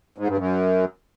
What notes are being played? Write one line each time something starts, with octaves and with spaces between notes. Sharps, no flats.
G#2
G2
F#2